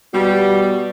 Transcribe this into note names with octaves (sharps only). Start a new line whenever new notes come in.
B2 G3